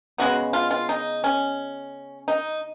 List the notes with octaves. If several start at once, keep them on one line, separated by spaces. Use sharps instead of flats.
C#3 G#3 B3 F#4
F4
F4
D#4
C#4
D#4